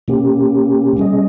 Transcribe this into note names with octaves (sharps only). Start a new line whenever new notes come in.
B2 A#3 C#4 G4
B2 G3 C#4 G#4 D#5